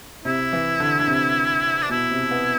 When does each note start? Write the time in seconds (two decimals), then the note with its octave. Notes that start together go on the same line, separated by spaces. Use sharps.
0.25 C3 E4
0.53 E3
0.80 D3
0.99 D3
1.07 C3
1.82 D4
1.89 B2 E4
2.11 C3
2.31 B3